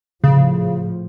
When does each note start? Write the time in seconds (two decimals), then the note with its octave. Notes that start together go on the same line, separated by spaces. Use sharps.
0.24 A2 C#3 F3